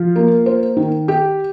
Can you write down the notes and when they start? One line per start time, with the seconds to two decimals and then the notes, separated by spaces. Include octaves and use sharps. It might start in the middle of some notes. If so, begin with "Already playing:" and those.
Already playing: F3 F4
0.16 A#3
0.46 C5
0.77 D#3
1.08 G4